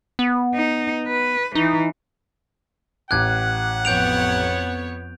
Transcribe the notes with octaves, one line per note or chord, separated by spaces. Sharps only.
B3
D#4
B4
E3 D#4
A1 F#5 D6 F#6 G#6
F2 B3 C#5 G6 D7 F7